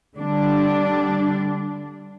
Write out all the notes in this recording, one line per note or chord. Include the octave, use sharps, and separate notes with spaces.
D3 G3 D4